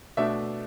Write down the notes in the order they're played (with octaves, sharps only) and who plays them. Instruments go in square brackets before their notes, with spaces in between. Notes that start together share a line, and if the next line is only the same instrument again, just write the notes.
[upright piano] B2 A3 D4 E5